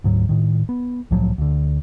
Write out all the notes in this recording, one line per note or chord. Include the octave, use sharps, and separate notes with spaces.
D2 G#2 F#3
A2 D#3
B3
C2 A2 F3 F#3
D2 D3